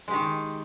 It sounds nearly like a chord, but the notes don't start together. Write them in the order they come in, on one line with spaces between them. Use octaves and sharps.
G#3 G4 D#3